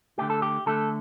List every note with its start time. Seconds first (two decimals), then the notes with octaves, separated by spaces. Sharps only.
0.18 D3 A3 G4
0.30 A4
0.42 G4
0.66 D3 A3 A4